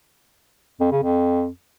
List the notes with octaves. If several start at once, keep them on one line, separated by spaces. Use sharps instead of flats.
F2
C#3
F2